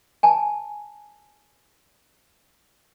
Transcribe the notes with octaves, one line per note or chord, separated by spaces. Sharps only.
G#5 A5